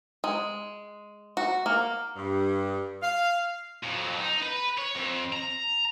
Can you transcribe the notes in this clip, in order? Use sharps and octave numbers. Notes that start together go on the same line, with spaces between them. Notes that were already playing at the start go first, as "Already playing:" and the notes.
G#3
F#4
A#3
G2
F5
F2 F#3
D#4
B4
C#5
F2
A#5